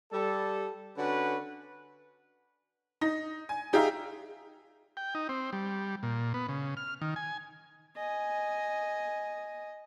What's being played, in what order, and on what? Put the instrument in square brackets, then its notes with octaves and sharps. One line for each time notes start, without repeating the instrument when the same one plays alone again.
[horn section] G3 A4
D3 C#4 F#4 B4
[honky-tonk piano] D#4 A#6
G#5
D#4 G4 G#4 E5 F5 A#5
[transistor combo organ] G5
D#4
C4
G3
A#2
B3
C#3
F6
D#3
G#5
[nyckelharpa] D#5 G#5